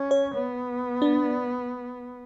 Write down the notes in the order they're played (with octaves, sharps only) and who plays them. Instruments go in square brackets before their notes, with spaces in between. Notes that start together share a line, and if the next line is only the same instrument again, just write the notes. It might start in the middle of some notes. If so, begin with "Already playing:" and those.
Already playing: [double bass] C#4
[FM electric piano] C#5
[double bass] B3
[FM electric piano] D4